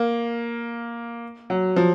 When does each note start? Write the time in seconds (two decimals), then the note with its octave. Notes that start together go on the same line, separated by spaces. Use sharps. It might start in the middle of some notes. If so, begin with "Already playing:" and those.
Already playing: A#3
1.50 F#3
1.76 F3